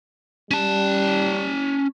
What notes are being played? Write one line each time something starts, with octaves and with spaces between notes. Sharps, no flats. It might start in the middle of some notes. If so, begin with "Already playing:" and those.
G3 C#4 A5